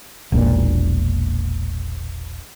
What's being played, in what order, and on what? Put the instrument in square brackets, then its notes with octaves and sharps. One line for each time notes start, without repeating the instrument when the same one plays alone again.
[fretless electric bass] E1 A#1 A#2